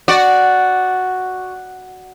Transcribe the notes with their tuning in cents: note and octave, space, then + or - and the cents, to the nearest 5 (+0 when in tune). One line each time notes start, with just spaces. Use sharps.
F#4 +0 D5 +0